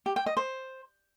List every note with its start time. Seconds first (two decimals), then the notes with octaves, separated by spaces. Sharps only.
0.06 G4
0.16 G5
0.26 D#5
0.37 C5